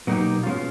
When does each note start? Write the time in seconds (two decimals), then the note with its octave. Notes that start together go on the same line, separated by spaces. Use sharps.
0.07 B2 F#3 A#3 D#4 G4
0.43 B2 G#3 C#4 F4